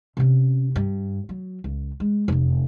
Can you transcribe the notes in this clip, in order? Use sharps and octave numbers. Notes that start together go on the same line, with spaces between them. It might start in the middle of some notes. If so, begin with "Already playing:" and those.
C3 C#4
G2
F#3
C#2
G#3
F1 F#2